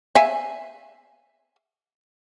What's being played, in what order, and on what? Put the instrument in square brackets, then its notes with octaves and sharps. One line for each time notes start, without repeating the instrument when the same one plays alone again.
[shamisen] E5 F5 G#5